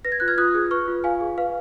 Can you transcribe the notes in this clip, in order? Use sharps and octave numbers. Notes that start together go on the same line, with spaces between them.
B4 A#6
G#6
F4 F#6
F6 G#6
F4 D#6 F#6
G#4
B4 C#6 F6
F4
F4 F5 G#5
G#4
B4 F5